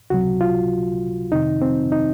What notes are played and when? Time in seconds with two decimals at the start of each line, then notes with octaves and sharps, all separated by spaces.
0.10 C#2 C3 F#3 F#4
0.41 F4
1.32 F2 C3 D#3 D#4
1.62 C4
1.92 D#4